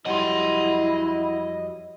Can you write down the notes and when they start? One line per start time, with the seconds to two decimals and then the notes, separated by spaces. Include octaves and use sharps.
0.06 F2 F#3 G3 E4 D#5 F#5 C6